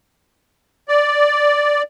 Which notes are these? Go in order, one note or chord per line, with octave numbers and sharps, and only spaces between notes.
D5